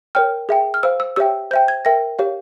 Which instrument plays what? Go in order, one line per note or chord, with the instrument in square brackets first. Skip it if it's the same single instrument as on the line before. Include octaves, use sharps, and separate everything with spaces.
[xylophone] A#4 C#5 G5 F6
G#4 E5 G5
F6
C5 F5 E6
E6
G4 C#5 E5 G5 E6
C5 E5 G5 G6
G#6
A#4 E5 G5 A#6
G4 C#5 F5